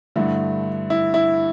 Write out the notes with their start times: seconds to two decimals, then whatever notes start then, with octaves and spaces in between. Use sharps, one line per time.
0.16 G2 D3 A3 E4
0.90 E4
1.14 E4